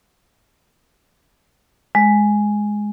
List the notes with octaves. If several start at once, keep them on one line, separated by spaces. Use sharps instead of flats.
G#3